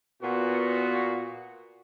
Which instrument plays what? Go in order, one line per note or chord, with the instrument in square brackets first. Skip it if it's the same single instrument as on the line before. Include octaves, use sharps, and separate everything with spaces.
[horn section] A#2 B3 F#4